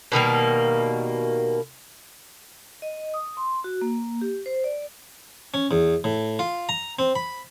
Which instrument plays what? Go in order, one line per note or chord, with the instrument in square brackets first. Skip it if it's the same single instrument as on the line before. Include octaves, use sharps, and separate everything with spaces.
[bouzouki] B2 D#3 G3 A#3
[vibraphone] D#5
D#6
C6
F#4
A#3
G4
C5
D5
[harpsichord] C#4
E2
A2
F4
A#5
C4
B5